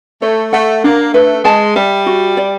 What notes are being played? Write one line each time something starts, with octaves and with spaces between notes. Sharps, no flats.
A3 C#5
A3 F#5
A#3 D4
A3 B4
G#3 A5
G3 E5
F#4
D5